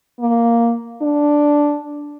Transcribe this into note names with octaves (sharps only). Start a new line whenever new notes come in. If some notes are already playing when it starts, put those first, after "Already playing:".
A#3
D4